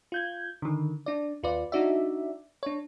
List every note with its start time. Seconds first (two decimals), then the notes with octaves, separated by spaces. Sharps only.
0.12 F4 G6 G#6
0.62 D3 D#3
1.06 D4 D5
1.43 D#2 F4 B4 D5
1.72 D4 D#4 F#4 D5 E5
2.63 D4 C#5